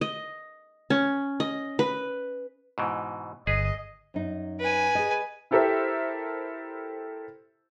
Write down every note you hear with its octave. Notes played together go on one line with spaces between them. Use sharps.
D#5
C#4
D#5
B4
G#2 B2 E3
G1 G#4 B4 D#5
F#2 D#4
B4 G#5
G#4 D#5
E4 G4 A4 A#4 C5 E5